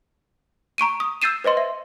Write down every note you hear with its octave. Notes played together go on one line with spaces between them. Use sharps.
A#5 C#6 D7 D#7
D#6
E6 G6 A6 C7 D#7 E7
B4 C5 D#5 C6
E5